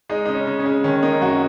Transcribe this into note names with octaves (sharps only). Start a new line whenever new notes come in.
G#3 D#4
C#3 D#4
C#4
C#3
C#4
G#3
D#3 C#4
A#3 D#4
F#2 F#4